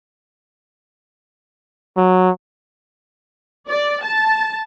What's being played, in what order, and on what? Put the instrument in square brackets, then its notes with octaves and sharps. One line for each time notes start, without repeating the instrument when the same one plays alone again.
[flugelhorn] F#3
[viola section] D5
A5